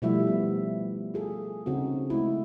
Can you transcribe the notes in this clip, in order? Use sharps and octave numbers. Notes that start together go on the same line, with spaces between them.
B2 F3 G3 A3 E4 E5
B3
F4 G#4 A4
C#3 C4 D#4 F#4
G#3 A3 E4